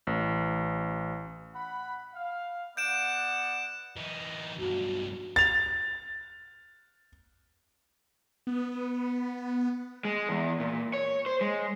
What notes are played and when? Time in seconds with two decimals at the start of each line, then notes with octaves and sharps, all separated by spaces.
0.07 A1
1.55 F#5 B5
2.15 F5
2.77 B3 D5 F#5 G6 D7 E7
3.97 E3 D#4
4.59 B1 G2 F#4
5.36 A6 F7
8.47 B3
10.05 G#3
10.29 E2
10.60 A#2
10.94 C#5
11.26 C5
11.41 G#3